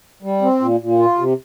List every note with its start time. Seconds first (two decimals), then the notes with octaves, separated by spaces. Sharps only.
0.22 G3
0.42 C4
0.61 A#2
0.80 A#2
0.99 F4
1.18 C3